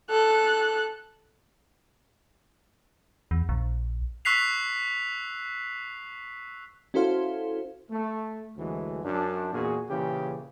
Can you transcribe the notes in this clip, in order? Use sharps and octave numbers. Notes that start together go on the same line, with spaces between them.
A4 F#6
E2
A#1
C#6 E6 F#6 B6 C7 F7
C#4 E4 F#4 A4 C5 F5
A3
A1 D2 E3 F#3 G#3
F#2 D4
E2 A#2 F#4 G#4
A#2 C#3 E3 G4 G#4